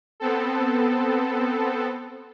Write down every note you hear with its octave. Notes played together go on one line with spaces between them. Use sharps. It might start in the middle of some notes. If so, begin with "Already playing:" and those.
B3 C4 A4